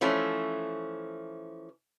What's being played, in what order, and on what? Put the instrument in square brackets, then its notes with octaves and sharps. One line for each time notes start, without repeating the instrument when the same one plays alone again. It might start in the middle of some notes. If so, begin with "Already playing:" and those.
[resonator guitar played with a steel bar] E3 F3 A3 C#4